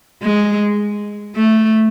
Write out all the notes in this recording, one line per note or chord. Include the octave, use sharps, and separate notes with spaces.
G#3
A3